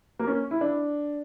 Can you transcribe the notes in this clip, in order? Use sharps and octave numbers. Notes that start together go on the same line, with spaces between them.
A#3
C#4
E4
D4